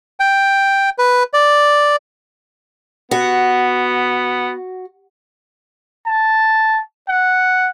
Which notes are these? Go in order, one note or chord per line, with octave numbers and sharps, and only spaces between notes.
G5
B4
D5
B3 F#4
A5
F#5